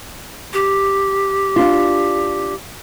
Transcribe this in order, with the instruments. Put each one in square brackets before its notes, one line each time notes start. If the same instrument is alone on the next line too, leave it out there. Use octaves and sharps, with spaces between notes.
[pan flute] G4
[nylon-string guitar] D4 F4